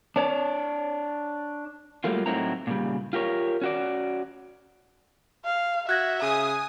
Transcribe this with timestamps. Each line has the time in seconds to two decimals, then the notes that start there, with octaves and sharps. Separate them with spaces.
0.16 D4 C#5 D5
2.04 F#3 G3 A3 A#3 F4
2.26 A2 F#3 C4 D#4 E4 A#5
2.67 A#2 C#3 G3
3.13 F4 G4 A#4 C#5
3.62 C#4 F#4 D5
5.45 F5
5.89 F#4 E5 F#6 G#6 A#6
6.22 C#3 G#5 D#6